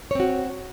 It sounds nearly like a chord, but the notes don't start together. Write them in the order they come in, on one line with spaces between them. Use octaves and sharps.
C#5 C4 F#4